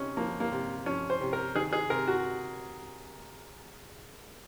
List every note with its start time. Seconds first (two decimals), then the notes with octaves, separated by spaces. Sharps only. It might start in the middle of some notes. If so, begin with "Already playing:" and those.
Already playing: C3 C#4 D#4
0.17 F3 A#3
0.40 A#3
0.51 C3
0.86 F3 C#4
1.10 C5
1.21 C3
1.33 A#4
1.55 D#3 G#4
1.73 G#4
1.90 C3 A#4
2.07 F#4